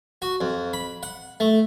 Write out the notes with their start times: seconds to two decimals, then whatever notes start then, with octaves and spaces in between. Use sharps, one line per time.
0.22 F#4
0.41 F2
0.73 B5
1.03 F#5
1.40 A3